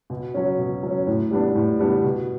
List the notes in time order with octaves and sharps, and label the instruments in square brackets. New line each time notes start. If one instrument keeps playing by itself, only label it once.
[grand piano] B2
F#3 C#4
B2
F#3 C#4
A2
G3 B3 D4
A2
G3 B3 D4
B2